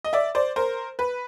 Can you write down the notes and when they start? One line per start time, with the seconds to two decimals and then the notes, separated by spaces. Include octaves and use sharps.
0.04 D#5
0.13 D5 E5
0.35 C5 D5
0.56 A#4 C5
0.99 B4